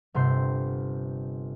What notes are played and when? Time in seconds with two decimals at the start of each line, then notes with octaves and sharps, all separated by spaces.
0.14 G1 C3 C6 G6